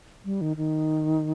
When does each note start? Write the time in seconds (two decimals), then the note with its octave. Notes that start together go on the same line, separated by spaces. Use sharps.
0.25 G3
0.41 D#3
0.57 D#3